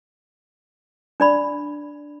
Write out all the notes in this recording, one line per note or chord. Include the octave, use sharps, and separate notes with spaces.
D4 D5 B5